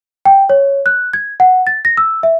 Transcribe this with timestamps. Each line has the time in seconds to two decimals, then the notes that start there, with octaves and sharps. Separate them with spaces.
0.25 G5
0.50 C#5
0.86 F#6
1.13 G#6
1.40 F#5
1.67 A6
1.85 A#6
1.97 E6
2.23 E5